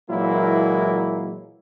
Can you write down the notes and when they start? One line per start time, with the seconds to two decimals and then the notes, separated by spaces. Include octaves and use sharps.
0.10 A#2 E3 F#3 G#3 A#3 E4